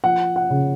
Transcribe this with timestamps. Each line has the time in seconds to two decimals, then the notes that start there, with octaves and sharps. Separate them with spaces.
0.04 F3 F#5
0.36 F#5
0.50 C#3